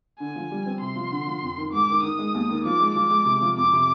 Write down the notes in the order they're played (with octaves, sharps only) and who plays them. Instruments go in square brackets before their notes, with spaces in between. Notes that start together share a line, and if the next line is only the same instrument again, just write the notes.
[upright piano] D3 [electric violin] G#5
[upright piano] F3
G3
C4
[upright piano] C3 [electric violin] C6
[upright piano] F3
D3
F3
F2
D#3
[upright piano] G#2 [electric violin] D6
[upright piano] D#3
[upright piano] D#3 [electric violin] D#6
[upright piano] G#3
D#2
D#3
[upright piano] F3 [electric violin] D6
[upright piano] G#3
[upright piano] F3 [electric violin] D6
[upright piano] G#3
C3
F3
[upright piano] F2 [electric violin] D6
[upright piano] C3